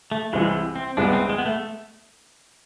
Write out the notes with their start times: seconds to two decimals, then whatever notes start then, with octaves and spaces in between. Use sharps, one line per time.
0.12 A3
0.33 C2 C3 E3 G#3
0.76 C4
0.97 C2 C3 G#3 B3 D4
1.13 C4
1.29 G#3
1.38 B3
1.45 A3